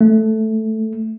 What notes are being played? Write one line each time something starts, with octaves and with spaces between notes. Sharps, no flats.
A3